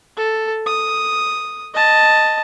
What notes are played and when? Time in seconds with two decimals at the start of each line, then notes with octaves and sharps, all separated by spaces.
0.17 A4
0.66 D#6
1.74 D#5 A5